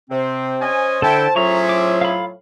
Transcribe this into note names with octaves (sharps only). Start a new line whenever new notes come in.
C3 C4 C5
C#4 D#5 G#5
D3 E4 A4 G5 A5
A2 F#3 C#4 F4 G#4 E5 A#5 C#6
D6
F5 B5